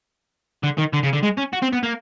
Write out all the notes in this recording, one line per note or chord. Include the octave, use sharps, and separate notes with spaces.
D3
D#3
D3
C#3
D3
G#3
C#4
F#4
C4
B3
A#3